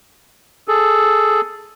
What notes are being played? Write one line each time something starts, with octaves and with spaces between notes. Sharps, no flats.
G#4 A4